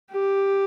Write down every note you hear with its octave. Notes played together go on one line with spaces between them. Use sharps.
G4